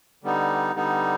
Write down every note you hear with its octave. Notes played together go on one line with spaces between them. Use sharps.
D3 G3 B3 D#4
D3 G3 B3 D#4